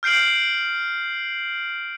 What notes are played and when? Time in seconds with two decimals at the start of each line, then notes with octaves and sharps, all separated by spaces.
0.03 F6 G6 C7 D7 F#7